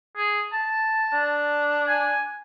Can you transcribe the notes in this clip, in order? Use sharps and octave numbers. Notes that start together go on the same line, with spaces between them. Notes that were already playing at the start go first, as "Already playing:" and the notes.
G#4
A5
D4
G#5